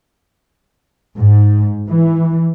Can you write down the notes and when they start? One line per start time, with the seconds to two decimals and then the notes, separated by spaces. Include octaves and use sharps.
1.18 G#2
1.89 E3